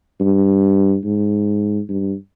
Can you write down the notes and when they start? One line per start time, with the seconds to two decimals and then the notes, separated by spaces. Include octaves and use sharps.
0.21 G2
1.05 G#2
1.89 G2